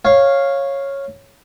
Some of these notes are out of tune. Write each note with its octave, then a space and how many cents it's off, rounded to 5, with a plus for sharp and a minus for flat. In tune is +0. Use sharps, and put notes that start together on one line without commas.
C#5 -10 F5 +0